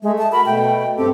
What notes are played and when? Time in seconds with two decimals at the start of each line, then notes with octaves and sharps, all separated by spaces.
0.03 G#3 A3
0.18 A5
0.32 F#4 A#4 B5
0.46 B2 A3 G5
0.98 G2 C4 G4 A4